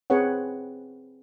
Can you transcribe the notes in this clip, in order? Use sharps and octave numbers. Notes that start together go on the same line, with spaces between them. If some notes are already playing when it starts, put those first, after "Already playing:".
C4 G#4 B4 C#5 F#5